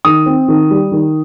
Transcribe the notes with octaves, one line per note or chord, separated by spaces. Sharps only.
D#3 D#6
C4
D#3
G3
D#3